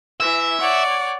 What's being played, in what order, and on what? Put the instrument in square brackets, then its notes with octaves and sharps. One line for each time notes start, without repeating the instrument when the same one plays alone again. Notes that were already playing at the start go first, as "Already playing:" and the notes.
[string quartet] E3 [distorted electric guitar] E5
[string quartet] C#5 D5 F#5